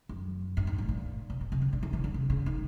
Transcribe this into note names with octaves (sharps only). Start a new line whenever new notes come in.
F#2
G2
G#2
A2
A#2
B2
B2
C3
C#3
D3
E3
E3
D3
C3
C#3
D#3